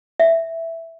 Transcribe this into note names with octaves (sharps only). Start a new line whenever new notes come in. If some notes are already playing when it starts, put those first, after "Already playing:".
E5